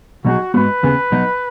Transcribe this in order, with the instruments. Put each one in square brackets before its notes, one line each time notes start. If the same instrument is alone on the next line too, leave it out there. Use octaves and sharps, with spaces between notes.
[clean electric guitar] B1 B2 F#3 D#4 G#4 [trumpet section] F#4
[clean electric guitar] G#2 G#3 B3 F#4 [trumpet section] B4
[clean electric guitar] D#2 C#3 B3 G#4
B1 B2 F#3 D#4 F#4